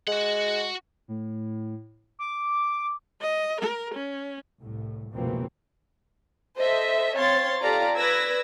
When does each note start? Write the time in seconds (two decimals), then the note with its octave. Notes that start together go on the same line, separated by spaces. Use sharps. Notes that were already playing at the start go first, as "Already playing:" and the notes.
0.07 G#3 F#4 F#5
1.08 A2
2.19 D6
3.21 D#5
3.60 A#4
3.94 C#4
4.61 C2 A2
5.13 F1 C#2 B2 E3 A#3 C4
6.56 A4 C5 D#5 E5
7.17 C4 C#5 F5 C6 A6
7.62 F4 G4 A4 D5 F5 A#5
7.98 B4 D5 E6 G#6 A#6